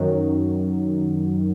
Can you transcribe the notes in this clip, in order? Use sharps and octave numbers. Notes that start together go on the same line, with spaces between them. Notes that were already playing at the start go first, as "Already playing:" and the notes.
Already playing: F#2 D#3 F#3